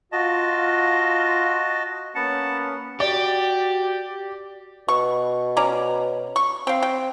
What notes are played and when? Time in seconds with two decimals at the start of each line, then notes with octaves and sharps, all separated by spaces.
0.12 F4 F#4 D#5 A5
2.15 A#3 B3 C#4 F#5 A5
3.00 F#4 G4 D5
4.88 B2 C#6
5.57 C#4 D5 A#5
6.36 C#6
6.67 C4 F5 G5
6.82 G5